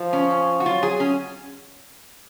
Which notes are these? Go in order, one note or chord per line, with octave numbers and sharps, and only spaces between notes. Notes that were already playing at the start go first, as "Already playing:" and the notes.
Already playing: F3
C#4
F#4
F#3 F4
G#4
C#4